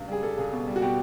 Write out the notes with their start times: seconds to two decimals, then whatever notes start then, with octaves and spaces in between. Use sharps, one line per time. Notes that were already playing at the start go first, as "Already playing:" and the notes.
Already playing: C#2 G2
0.08 G3 G#4
0.22 G3 A4
0.37 C#2 G#4
0.52 B2
0.67 G3
0.76 F#4
0.82 B2 G4